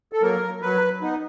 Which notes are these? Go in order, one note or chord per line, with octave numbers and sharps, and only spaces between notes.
A4
F#3 A#3 A#4
F#3 B4
B3 D#4